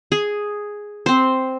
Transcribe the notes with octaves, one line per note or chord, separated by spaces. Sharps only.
G#4
C4 C5